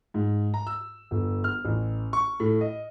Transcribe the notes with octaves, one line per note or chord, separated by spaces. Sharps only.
G#2
A#5
E6
G1
F6
A1
C#6
A2
D#5